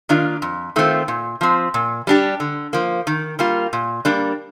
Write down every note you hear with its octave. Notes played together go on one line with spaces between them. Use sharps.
D#3 A#3 D4 F4
F2
D#3 A3 C4 F4
A#2
F3 C4
A#2
G3 D4 G4
D3
F3 A#3
D#3
G3 A#3 F4
A#2
G3 A#3 D4